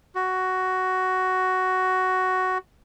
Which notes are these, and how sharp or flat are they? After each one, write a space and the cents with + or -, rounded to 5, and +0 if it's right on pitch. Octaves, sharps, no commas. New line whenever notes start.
F#4 +10